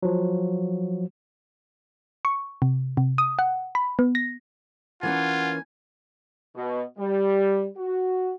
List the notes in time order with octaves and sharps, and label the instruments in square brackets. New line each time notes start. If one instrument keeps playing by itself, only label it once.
[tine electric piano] F3 F#3
[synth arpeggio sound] C#6
C3
C3
D#6
F#5
B5
B3
A#6
[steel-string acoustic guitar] E3 A#3 C#4 [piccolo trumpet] F4 [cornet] F#5 [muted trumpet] G#5
[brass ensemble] B2
G3
F#4